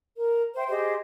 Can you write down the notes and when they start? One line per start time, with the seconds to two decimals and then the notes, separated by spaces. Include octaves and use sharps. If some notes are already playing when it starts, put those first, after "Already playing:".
0.16 A#4
0.54 C5 E5 G5
0.69 G4 G#4 C5 D#5